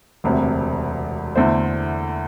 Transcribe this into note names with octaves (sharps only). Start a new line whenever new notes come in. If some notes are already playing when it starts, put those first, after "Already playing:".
E1 D2 C3
E2 D3 A3 E4 C5